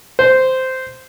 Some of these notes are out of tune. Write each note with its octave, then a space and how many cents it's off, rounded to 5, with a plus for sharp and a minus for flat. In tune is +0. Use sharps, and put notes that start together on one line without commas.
C5 -10